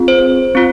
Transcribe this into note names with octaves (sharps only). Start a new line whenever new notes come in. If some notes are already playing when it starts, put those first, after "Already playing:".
Already playing: C4 F4 G#4
C5
C4 F4